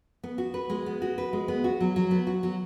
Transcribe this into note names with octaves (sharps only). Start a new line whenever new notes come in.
B3
F#4
B4
G#3
B3
F#4
B4
G#3
B3
F#4
F#3
F#3
B3
F#4
F#3